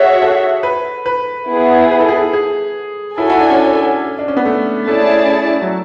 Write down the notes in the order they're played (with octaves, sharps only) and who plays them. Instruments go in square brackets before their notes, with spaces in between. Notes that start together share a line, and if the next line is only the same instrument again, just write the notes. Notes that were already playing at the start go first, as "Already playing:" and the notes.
Already playing: [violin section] F#4 C#5 E5 [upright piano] G#4
[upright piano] A4
B4
B4
[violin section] B3 E4 G#4
[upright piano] B4
A4
G#4
A4
G#4
[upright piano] E4 [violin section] F#4 A4 C#5 G#5
[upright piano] E4
D4
C#4
D4
C#4
B3
A3
[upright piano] A3 [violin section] C#4 E4 G#4 D5 A5
[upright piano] F#3